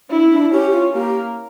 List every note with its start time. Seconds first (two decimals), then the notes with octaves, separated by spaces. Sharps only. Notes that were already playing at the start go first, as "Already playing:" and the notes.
0.10 D4 E4
0.25 C#4
0.31 D4
0.52 C#4 G4
0.72 F4
0.93 A#3 G4